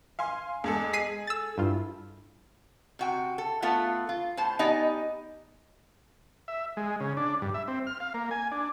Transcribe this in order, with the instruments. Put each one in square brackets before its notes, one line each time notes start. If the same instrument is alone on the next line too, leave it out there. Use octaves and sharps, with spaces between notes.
[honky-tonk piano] F5 G#5 C6
[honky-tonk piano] E2 G#4 A4 [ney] G#3
[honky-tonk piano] G#4 [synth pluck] B6 C7 D#7
[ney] A4 [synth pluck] E6 A6
[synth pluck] G2 F4 [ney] E4
[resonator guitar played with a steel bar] C3 F#4 G5
A4
A3 B3 F4 A4
F4
A2 C5 A5
B3 D#4 G4 D5 D#5 G#5
[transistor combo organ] E5
G#3
C#3
D4
G2
E5
C4
F6
F5
A#3
G#5
D4